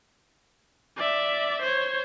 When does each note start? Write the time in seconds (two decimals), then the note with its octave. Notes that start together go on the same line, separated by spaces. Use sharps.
0.97 D5 E5
1.62 C5 C#5